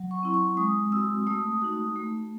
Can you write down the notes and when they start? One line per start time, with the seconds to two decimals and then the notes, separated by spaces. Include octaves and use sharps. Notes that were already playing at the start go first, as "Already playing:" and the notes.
Already playing: F#3
0.11 C#6
0.23 C4 E4
0.34 C#6
0.57 G#3 D#6
0.92 C4 F#4 E6
1.27 A3 D#6
1.62 D#4 F#4
1.96 A3